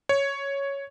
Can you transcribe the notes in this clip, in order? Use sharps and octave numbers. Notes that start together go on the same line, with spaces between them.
C#5